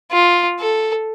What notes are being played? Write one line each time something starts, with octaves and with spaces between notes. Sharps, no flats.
F4
A4